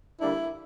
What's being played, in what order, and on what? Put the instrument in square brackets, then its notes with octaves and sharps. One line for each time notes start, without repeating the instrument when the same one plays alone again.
[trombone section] D3 G3 A#3 D4 [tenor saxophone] E4